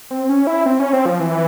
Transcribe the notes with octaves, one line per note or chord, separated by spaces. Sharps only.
C4
C#4
E4
C4
C#4
C4
F3
E3